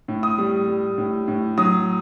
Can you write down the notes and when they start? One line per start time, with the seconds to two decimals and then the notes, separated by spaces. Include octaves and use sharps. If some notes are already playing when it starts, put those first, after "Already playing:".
0.08 A2
0.23 D#6
0.38 G3
0.68 G3
0.98 A2
1.28 A2
1.58 F#3 D#6